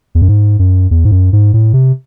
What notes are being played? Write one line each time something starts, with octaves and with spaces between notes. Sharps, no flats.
E2
F#2
G#2
F#2
E2
G#2
F#2
G#2
A2
C3